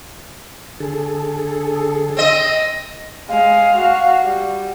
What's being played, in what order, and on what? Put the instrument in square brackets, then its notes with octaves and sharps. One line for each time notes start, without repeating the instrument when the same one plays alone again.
[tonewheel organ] D3 G#4 A4
[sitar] C4 D#5
[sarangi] G#3 [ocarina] F5
[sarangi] F#4
G3